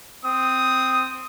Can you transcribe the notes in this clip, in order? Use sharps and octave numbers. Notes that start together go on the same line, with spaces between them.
C4 D#6